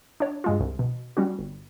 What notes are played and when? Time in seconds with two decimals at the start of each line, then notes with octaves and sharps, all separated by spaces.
0.20 D4 C#5
0.44 G2 G#3 F4
0.59 C2
0.79 B2
1.17 G3 C#4 F#4
1.39 G1